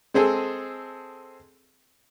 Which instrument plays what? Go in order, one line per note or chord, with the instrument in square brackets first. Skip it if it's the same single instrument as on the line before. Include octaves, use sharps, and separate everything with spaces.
[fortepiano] G#3 C4 G#4 A4